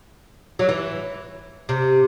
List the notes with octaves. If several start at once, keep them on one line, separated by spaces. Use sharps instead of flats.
F#3
E3
C3